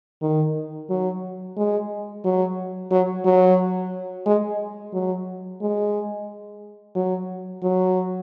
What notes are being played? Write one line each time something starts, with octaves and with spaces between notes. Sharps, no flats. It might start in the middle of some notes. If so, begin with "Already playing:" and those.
D#3
F#3
G#3
F#3
F#3
F#3
G#3
F#3
G#3
F#3
F#3